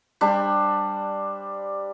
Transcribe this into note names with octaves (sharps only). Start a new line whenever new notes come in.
G3 D4 C5